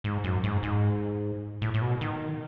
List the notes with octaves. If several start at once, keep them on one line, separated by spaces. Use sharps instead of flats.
G#2
F#2
G#2
G#2
A2
A2
B2
D#3